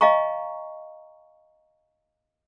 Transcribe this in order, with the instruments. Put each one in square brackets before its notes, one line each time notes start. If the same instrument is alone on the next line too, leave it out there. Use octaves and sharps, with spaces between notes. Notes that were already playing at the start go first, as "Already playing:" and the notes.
[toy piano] D#5 F5 G#5 A#5 C#6